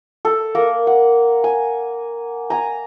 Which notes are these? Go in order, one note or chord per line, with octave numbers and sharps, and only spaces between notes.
A4
A#3 A#4
F#5
G#5
G#5 A#5